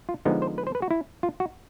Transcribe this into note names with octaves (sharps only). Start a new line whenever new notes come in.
F4
D3 F3 G#3 B3 D#4 A#4
C5
B4
C5
B4
F#4
E4
F4
F#4